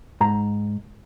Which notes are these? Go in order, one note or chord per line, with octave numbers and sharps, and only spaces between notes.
G#2 A#5